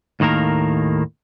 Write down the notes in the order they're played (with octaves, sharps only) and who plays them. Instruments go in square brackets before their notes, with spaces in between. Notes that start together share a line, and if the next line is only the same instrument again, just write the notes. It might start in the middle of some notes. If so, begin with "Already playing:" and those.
[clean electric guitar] D#2 A2 D#3 A#3 A#4